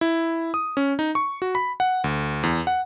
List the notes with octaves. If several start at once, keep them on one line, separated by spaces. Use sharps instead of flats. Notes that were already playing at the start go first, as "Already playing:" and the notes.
E4
D#6
C#4
D#4
C#6
F#4
B5
F#5
D2
E2
F#5